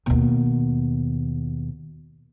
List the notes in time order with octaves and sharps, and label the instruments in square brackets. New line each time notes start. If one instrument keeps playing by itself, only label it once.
[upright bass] D#2 B2